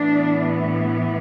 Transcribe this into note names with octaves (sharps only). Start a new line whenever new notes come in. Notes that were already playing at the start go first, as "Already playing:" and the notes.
Already playing: A2 E3 B3 D4